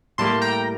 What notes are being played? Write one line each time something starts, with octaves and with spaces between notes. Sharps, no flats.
A2 G3 A#3 A5 C6
G5 A#5